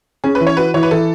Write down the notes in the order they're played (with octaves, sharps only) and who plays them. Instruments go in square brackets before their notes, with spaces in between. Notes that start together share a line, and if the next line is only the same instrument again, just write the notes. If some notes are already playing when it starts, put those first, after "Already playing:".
[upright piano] C#4 [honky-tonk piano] G#4
[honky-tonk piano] B4
[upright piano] E3
[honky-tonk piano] C#5
[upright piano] F#4 [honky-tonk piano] B4
[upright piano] E3 [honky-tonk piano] C#5
[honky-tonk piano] B4
[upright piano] E3 [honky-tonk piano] A4